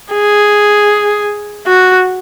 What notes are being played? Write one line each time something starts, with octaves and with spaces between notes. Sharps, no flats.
G#4
F#4